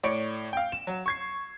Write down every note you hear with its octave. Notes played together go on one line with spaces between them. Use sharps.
A2 C#5 D5 C#7 D7
F5 G5
E7
F#3
C#6 G#6 C7